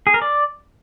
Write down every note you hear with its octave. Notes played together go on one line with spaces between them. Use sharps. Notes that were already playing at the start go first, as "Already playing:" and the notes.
G#4
A#4
D5